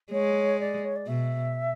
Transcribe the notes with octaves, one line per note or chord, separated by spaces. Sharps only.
G#3 C#5
D5
C#5
D5
B2 E5